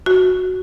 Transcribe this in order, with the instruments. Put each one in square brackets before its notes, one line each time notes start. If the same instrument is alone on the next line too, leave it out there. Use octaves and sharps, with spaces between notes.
[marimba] F#4